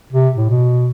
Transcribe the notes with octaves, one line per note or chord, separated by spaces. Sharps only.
C3
A2
B2